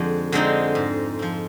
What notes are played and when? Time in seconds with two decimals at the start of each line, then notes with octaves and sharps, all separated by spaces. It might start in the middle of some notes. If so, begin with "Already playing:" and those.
Already playing: F2 D3 G#3 C4 D#4
0.32 D3 G#3 C4 D#4
0.75 G#2
1.19 F3 C4